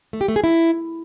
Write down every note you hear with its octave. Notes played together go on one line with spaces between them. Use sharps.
A3
G4
A3
G#4
E4